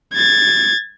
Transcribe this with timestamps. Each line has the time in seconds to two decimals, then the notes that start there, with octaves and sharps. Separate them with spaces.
0.14 G#6 A6